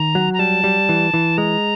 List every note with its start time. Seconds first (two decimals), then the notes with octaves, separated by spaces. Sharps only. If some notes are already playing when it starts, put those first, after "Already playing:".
Already playing: D#3 A#5
0.15 F#3
0.34 A#5
0.39 G3 A5
0.64 G3
0.89 E3
1.14 E3
1.38 G#3 A#5